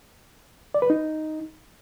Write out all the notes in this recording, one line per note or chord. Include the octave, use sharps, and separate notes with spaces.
D5
B4
D#4